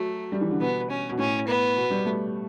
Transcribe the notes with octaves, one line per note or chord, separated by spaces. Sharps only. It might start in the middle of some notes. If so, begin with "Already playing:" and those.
Already playing: F#3 A3
G3
E3
D3
B2 B3
C#4
B2
A2 C#4
B3
B2
G3
A3